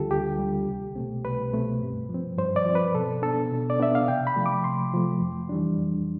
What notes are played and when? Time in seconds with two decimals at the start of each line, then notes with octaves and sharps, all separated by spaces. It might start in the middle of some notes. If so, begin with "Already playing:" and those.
Already playing: D2 D3 G3 F4 G4 A4
0.11 D2 G4
0.39 D3 G3
0.68 C2
0.95 B2 A3 C4
1.24 C2 B4
1.53 B2 A3 C4
1.82 G2
2.09 F3
2.14 C4
2.38 G2 C5
2.56 D5
2.66 F3 C4
2.75 B4
2.94 B2 A4
3.22 B3 D4 A4
3.51 B2
3.70 D5
3.80 B3 D4 E5
3.95 F5
4.08 C3 G5
4.27 B5
4.36 F3 A3
4.46 D6
4.64 C3 C6
4.94 F3 A3
5.21 F2
5.49 E3 G3 D4
5.78 F2